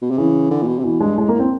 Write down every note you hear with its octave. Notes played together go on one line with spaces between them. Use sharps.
B2
C3
C#3 E3
D3
A#2
B2
C3
B2 E3
G2 G#3
A2 G#3
A#3
A2
C4